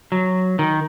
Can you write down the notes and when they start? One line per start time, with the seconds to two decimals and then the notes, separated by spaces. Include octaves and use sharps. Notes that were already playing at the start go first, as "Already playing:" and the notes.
0.12 F#3
0.59 D#3